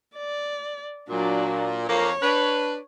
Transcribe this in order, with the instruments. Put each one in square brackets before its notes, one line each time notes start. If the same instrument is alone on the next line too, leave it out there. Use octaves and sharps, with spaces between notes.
[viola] D5
[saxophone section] A#2 [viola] F#3 D4
[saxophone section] F2 A#3 [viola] C#5
[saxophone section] D4 B4